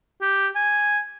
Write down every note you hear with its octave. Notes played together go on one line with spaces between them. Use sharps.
G4
G#5